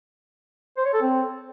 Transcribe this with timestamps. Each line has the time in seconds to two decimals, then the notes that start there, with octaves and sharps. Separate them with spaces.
0.77 C5
0.85 C#5
0.93 A4
1.02 C4